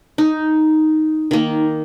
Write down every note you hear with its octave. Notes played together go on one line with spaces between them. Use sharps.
D#4
D#3 A#3